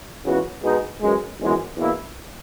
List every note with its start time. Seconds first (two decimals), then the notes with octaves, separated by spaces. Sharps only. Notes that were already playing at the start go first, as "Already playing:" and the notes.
0.24 C#2 C#3 E3 B3 F#4
0.63 B2 G#3 B3 D#4
1.01 F#2 E3 G#3
1.39 G#1 F#2 E3 G#3 B3
1.77 E2 B2 A#3 E4